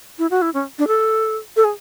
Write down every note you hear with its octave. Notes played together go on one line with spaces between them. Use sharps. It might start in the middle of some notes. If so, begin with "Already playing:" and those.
E4
F#4
E4
C#4
D4
A4
A4
G#4